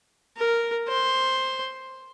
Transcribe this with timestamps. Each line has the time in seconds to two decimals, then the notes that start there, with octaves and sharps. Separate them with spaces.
0.37 A#4
0.88 C5